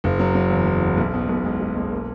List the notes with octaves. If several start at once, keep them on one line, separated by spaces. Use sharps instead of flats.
F#1
F#3
F#3
E2
E2
E2
B1
B2
B1
G#3
G#3
B1
A#3